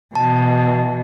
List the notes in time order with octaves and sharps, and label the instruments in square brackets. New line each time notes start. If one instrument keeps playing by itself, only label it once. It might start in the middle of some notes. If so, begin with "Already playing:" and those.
[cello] B2 E3 [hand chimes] A5